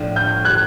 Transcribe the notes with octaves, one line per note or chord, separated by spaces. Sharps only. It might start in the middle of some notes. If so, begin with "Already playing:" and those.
Already playing: A2 F3 A3 D4
F6 G6
F#6 G#6